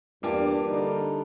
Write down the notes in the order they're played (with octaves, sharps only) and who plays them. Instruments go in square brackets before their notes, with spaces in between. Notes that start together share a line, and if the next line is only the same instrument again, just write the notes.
[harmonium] E2 [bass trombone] G2 [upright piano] A#3 F4 G4 [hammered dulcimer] D4
[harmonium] D3 G3 D#4